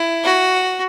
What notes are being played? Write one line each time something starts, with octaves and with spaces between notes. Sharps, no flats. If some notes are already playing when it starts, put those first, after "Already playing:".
Already playing: E4
F#4